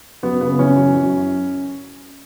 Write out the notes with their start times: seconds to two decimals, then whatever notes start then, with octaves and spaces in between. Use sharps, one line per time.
0.23 F#2 B3
0.41 C#3 B3
0.59 E3 C#4
0.76 F#2
0.94 F#2